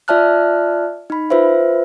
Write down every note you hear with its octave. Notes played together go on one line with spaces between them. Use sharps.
F4 D5 E5 A5 F6 F#6
D#4 B5
F4 B4 C5 E5